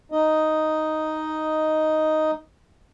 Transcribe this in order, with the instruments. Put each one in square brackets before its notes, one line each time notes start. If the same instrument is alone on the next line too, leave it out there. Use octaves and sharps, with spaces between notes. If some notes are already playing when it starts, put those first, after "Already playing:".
[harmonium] D#4 D#5